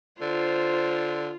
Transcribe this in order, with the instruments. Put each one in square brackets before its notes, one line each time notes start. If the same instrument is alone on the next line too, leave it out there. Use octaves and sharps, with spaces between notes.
[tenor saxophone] D3 [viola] F4 [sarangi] C5